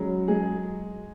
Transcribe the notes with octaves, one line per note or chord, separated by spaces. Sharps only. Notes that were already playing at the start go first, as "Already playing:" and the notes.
Already playing: C#3 F#3 G#3
G#3 G#4